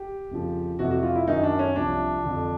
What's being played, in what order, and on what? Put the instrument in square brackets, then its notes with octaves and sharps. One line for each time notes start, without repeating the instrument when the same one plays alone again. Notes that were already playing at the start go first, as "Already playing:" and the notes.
Already playing: [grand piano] G4
F2 C#3 F3
F2 C3 E3 F#4
F#4
F4
E4
F#2 D#3 F#3 D#4
D4
C#4
C2 C3 F3 D4
F2 D3 F3